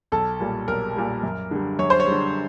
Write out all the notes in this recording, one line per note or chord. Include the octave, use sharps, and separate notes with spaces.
B1 A4
A#2 G3
B1 A#4
A#2 G3
F#2
D3 G3
F#2 C#5
C5
C#5
G3
D3